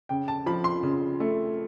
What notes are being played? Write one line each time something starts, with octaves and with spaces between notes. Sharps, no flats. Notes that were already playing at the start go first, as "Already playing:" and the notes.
C#3 G5
A5
F3 B5
C6
C#3
A3